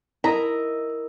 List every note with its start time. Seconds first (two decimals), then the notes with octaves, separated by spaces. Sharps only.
0.24 E4 A#4 D#5 A#5